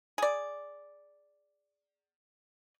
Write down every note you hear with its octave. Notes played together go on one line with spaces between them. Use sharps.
G#4 D5